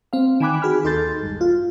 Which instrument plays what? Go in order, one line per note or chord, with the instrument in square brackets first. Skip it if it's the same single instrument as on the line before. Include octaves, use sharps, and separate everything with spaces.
[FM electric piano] C4 F5
D#3 G5 G#5 B5 D6 F#6
F#4 G#4 B5 F6
D#2 D#4 A4 C6 G6 A6
G#1 G2
F4